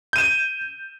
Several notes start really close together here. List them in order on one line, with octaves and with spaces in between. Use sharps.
G6 D#7 E7